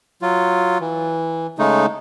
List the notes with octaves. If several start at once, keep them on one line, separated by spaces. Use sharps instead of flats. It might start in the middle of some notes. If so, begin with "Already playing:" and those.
F#3 F4
E3
C#3 G#3 A3 D#4